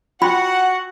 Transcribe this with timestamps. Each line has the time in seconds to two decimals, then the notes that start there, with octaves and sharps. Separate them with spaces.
0.22 F4 F#4 F#5 G5 B5